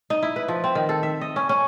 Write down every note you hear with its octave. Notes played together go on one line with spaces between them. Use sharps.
D#4
E4
B4
F3
C4
D#3
A4
E5
D#5
C#4
C#4